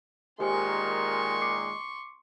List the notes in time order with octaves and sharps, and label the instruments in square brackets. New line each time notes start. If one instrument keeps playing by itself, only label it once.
[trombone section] A#2 D#3 G#3 [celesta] G4 C5 G#5 [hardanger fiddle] C6 C#6
[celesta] D6 C7 C#7